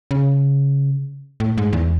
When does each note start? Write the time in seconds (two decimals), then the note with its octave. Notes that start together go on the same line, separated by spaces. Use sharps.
0.11 C#3
1.40 A2
1.58 G#2
1.73 E2